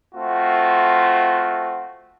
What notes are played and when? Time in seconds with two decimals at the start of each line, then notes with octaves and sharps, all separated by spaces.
0.15 A3 C4 F4 F#4